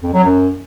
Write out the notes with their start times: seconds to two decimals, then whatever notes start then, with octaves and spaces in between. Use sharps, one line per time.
0.03 F2
0.14 F#3
0.24 F#2